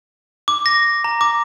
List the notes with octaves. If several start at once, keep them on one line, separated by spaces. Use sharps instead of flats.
D6
A#6
A#5
D6